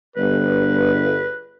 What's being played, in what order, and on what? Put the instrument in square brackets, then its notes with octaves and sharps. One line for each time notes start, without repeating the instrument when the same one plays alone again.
[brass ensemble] G1 [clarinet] B4